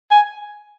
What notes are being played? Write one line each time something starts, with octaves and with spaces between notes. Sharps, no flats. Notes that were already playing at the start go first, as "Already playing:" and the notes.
G#5